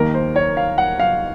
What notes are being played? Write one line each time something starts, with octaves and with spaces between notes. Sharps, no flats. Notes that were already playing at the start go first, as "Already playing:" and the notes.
Already playing: D#2 D#3 A#3 A#4
C5
C#5
F5
F#5
F5